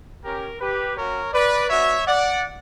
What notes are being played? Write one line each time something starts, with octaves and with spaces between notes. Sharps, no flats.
C#4 G4 A#4
G4 B4
A#3 C#4 F#4 A#4 C#5
B4 D5
B3 D4 F#4 C#5 E5
D5 F#5